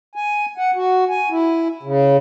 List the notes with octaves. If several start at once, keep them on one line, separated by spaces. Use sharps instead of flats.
G#5
F#5
F#4
G#5
E4
C#3